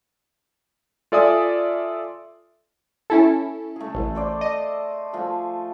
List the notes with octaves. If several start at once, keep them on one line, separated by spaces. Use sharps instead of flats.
F4 A4 D5 E5 G#5 D#6
C#4 E4 A4
A3 G#4
A1
A4 C5 D5
D#5
F3 A3 G#4